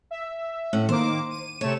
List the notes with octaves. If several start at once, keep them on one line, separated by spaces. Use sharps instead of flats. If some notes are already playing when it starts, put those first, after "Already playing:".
E5
A2 C#4 F#5
D#3 A#3 C5 D6
D#7
C3 A3 C#5 E7